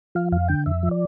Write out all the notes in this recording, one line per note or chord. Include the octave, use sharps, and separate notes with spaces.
F3 F5
F2 F5
D3 G5
F2 E5
F3
D5